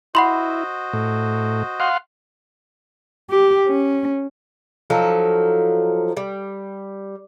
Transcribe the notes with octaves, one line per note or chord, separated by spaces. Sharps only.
E4 F#4 C5 D#5 F#5 B5 C6
A2
F5 F#5 C6
G4
C#4
F3 F#3 D#4 A4
G3